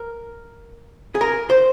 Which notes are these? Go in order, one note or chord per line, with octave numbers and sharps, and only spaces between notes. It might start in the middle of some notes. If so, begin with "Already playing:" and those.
Already playing: A#4
G#4
A#4
C5